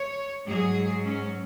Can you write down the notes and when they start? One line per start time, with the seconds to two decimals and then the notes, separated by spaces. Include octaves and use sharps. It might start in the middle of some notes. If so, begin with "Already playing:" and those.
Already playing: C#5
0.46 G#2 F#3 G#4
1.04 C#4